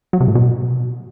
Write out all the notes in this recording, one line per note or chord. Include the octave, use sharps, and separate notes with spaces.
F#3
C3
A2
B2